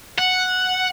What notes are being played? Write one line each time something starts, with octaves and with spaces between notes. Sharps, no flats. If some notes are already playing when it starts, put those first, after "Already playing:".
F#5